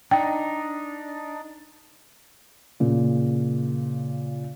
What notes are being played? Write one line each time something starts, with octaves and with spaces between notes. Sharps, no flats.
D4 D#4 G5
A#2 C#3